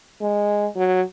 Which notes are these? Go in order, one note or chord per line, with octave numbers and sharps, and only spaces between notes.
G#3
F#3